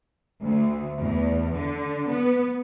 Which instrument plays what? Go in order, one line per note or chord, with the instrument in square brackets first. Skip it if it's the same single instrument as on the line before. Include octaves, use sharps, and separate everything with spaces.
[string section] D2
E2
D3
B3